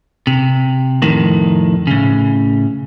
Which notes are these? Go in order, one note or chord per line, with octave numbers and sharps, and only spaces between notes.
C3
F2 A2 D#3
A2 C#3